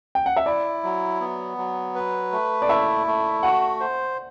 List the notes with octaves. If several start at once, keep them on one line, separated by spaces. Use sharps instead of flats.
G5
F#5
E5
E4 D5
F#3
B3
F#3
B4
A3
D5
E4 E5
A3
F#4 F#5
C5